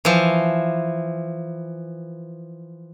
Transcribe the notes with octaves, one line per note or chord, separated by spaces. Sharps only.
E3 F3